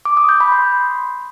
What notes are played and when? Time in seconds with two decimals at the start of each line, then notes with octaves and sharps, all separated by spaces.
0.05 D6
0.17 D#6
0.29 G6
0.40 B5
0.52 C6